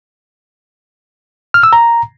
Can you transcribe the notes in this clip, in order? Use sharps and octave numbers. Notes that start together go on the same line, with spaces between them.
F6
E6
A#5